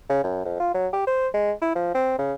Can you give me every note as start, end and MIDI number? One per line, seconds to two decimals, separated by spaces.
0.09 0.23 49
0.24 0.41 42
0.45 0.55 41
0.60 0.70 65
0.74 0.88 54
0.93 1.03 67
1.07 1.28 72
1.34 1.52 56
1.62 1.75 64
1.75 1.90 53
1.95 2.16 60
2.19 2.33 49